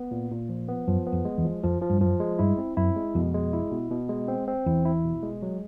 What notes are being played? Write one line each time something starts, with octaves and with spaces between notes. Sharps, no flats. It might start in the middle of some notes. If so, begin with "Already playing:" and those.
Already playing: B3
A#2
A#2
F3
B3
F#2 F3
B3
F2
G#3
E2
F3
F2 F3
F3
G2
F#2 F3
G#3
G2 E4
C4
F#2 E4
G#3
F2 B2
G#3
E4
B2
B2
G#3
C4
C4
E2 E4
E4
B2
G#3
F#3